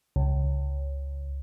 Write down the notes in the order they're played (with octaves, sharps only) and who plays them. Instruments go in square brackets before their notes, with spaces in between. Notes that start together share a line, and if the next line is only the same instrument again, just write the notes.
[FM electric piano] C#2